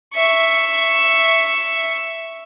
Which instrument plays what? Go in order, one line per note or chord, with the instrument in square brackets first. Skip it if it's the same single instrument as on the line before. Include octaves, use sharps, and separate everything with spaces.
[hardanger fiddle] E5 C#6